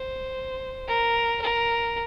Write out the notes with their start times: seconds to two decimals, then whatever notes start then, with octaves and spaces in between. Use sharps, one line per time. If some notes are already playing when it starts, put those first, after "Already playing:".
Already playing: C5
0.88 A#4
1.42 A#4